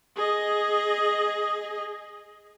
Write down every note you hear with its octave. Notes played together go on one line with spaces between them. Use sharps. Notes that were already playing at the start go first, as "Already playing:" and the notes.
G#4 D#5